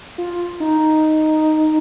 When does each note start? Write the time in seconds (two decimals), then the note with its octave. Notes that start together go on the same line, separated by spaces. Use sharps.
0.18 F4
0.60 D#4